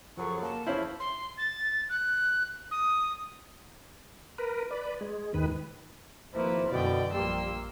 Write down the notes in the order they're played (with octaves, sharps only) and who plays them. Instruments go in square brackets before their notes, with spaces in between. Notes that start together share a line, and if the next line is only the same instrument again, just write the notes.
[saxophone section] F#2 C#3 F#3 [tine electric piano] F3 A4 [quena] C#6
[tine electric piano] A#3 [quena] A5
[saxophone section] E2 F3 [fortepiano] C#4 E4 [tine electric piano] C5 F5 B5
[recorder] C6
A6
F#6
D#6
[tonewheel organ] A#4 B4
B4 D5
G#3
D#2 G#2 D#3 B4
[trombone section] G#1 C5 [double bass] F3 A#3 [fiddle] E4 B4
[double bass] F#2 D3 [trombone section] B2 [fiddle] D5 G5
[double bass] A#1 A#3 [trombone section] F3 G3 G4 [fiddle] C6 E6